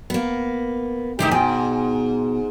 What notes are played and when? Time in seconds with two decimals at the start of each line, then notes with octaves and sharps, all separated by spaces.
0.10 A#3 B3
1.19 A2 C3 D#3 G#3 D#4 G4 C5
1.31 G#2 B2 G5 G#5